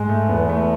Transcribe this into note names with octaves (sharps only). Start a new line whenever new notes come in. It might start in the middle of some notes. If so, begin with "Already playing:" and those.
Already playing: G#2 G#3
A3
E2 B3
A3